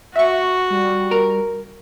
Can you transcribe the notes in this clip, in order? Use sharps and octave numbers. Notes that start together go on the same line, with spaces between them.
F#4 E5 C#6
G3
A#4